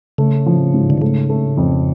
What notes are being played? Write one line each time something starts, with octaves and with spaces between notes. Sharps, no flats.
C#3 A3
F3
G#2
D3
C#3 A3
A3
F2